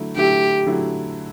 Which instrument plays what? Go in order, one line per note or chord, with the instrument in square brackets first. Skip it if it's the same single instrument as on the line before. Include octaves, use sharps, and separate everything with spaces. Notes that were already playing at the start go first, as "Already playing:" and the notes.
Already playing: [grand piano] D3 F#3 A3 E4
[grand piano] D3 F#3 A3 E4 [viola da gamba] G4
[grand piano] D3 F#3 A3 E4